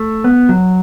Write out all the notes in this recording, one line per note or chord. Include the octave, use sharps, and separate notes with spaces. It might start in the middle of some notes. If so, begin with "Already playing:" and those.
Already playing: A3
B3
F#3